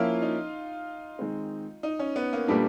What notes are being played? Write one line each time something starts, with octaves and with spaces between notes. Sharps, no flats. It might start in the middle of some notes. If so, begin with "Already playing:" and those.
Already playing: F3 A#3 C#4 E4 F4
D#4
D#3 G#3 C4
D#4
C#4
B3
A#3
A#2 G3 A3 B3 D4